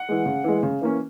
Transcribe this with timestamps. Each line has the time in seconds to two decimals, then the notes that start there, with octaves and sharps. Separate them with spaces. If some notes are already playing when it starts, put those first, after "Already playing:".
Already playing: F#5
0.09 E3 G#3
0.26 C#3
0.44 E3 G#3
0.63 C#3
0.81 E3 A#3 C#4